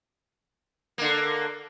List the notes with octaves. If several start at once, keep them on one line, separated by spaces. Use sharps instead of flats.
D3 A#3